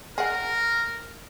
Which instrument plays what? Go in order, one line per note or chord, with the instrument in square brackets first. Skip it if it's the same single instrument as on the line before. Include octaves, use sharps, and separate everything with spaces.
[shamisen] G#4 F#5 [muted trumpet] A#4